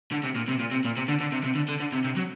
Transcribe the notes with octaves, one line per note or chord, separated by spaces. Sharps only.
D3
C3
A#2
C3
A#2
C3
A#2
C3
D3
D3
C3
C3
D3
D3
D3
C3
C3
F#3